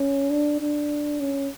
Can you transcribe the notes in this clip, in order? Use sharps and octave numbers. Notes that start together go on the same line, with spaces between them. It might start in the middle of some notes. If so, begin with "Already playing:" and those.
Already playing: C#4
D4
D4
C#4